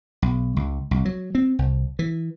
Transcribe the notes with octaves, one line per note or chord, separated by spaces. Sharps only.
B1
C#2
C2
F#3
C4
C2
E3